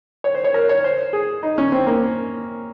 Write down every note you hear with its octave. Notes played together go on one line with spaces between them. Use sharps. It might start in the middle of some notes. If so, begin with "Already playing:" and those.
C#5
C5
C#5
A#4
C#5
C5
G#4
D#4
C#4
C4
A#3